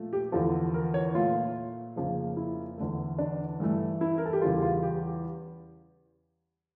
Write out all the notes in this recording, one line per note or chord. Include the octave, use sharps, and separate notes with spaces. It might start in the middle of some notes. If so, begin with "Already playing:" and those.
Already playing: A#2 F3 A3
G4
E2 D3 F3 A4
A#4
C#5
A#2 A3 F4
F2 C#3 F3 A#3
E4
E2 D3 A3
D4
G2 E3 A3
E4
A#4
A4
G4
E2 C#3 G3 F4
F4
G4